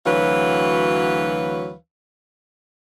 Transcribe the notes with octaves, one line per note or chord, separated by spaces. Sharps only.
D2 E3 F#3 B4 C#5 F5